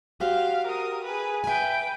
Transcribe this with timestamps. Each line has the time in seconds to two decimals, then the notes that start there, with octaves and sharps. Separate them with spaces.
0.20 F#4 G4 C5 F5
0.67 A#4 D#6
1.04 G#4 B4
1.44 B4 E5 G5 G#5